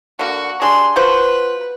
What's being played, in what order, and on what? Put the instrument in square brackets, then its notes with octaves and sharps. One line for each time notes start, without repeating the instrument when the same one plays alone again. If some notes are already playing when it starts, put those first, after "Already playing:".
[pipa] D3 A#3 [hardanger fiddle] F#4
[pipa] G3 D4 G#4 [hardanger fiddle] C6
[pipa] F3 F#4 C5 [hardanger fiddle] B4